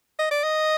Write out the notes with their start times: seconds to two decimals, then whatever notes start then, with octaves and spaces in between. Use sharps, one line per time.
0.19 D#5
0.31 D5
0.43 D#5